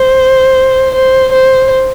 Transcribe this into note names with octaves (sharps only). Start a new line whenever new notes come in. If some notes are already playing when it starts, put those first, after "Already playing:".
Already playing: C5
C5
C5